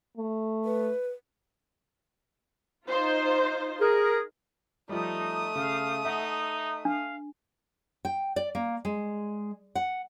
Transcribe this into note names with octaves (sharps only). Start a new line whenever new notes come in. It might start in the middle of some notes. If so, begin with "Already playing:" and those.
A3
B4
D#4 F4 C5
G#4 A#4
F3 G3 A3 D#4 D#6
C#3 F5
D#4 E5 F#5
D4 F5
G5
D5
A#3
G#3
F#5